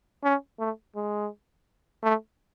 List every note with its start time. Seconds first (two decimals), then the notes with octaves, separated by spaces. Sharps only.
0.24 C#4
0.59 A3
0.95 G#3
2.03 A3